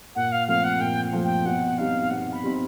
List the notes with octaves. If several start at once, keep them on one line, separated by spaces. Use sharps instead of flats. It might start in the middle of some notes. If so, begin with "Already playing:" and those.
A#2 F#5
F5
F3 A3 C4 F5
F#5
A#2 G5
F3 A3 C4
G5
B2 F#5
G3 C4 D#4 F5
B2 F#5
B5
G3 C4 D#4